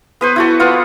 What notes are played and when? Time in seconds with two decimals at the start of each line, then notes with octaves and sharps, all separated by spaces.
0.21 B3 B4 C5
0.36 E4 F#4 A4
0.60 B3 F4 F#5